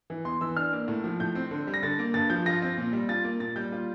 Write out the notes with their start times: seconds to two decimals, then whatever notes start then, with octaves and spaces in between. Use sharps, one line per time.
0.10 E3
0.25 E2 C6
0.41 E3 E6
0.56 D4 F6
0.73 A#3
0.88 A2
1.04 F3
1.20 A2 G6
1.35 C4
1.51 D3
1.67 G3
1.74 A#6
1.83 D3 A6
1.99 A#3
2.14 G2 A6
2.30 F3 G6
2.46 F4 A#6
2.62 C4
2.77 A#2
2.93 G3
3.09 F4 A6
3.24 A#3
3.40 A#2 A6
3.56 G3 G6
3.72 F4